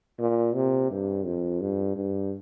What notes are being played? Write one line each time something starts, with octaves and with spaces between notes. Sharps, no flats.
A#2
C3
G2
F2
G2
G2